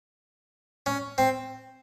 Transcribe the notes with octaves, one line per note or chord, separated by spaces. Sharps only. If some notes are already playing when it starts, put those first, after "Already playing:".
C#4
C4